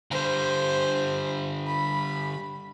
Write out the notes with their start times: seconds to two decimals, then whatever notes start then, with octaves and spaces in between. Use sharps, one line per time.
0.11 D3 G3 C5
1.67 B5